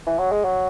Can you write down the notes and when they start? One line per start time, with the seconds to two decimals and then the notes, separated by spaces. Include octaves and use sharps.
0.07 E3
0.19 F#3
0.32 G#3
0.44 F#3